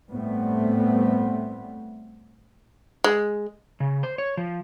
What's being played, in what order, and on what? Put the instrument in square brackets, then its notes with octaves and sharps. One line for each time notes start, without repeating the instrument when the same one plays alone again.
[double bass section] A2 G3 A3 B3 C4
[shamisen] G#3
[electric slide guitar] C#3
C5
C#5
F3